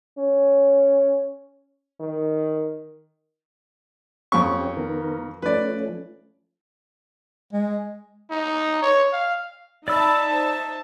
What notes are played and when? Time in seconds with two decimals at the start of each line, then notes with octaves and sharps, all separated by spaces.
0.18 C#4
2.00 D#3
4.32 F2 C4 C#4 G4 C#6
4.77 D#3 B3 A#4
5.42 F3 A3 C#4 B4 D5
7.53 G#3
8.31 D#4
8.82 C#5
9.13 F5
9.88 D#4 D5 E5 A5 B5 E6
10.31 C5